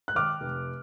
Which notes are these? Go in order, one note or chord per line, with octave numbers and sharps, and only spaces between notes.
F#6
D#3 D6 F6
F1